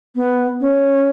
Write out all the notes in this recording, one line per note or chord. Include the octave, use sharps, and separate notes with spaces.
B3
C#4